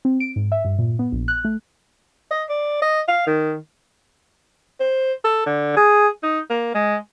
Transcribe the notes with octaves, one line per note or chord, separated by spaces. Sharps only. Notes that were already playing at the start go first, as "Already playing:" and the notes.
C4
D7
G#2
E5
G2
A#2
B3
A#1
F#6
A3
D#5
D5
D#5
F5
D#3
C5
A4
D3
G#4
D#4
A#3
G#3